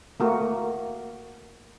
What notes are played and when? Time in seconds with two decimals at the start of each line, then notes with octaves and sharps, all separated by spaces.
0.20 A3 A#3 F#4